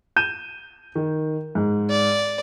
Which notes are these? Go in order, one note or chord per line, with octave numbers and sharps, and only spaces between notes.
G6 D#7 E7
D#3
G#2
D5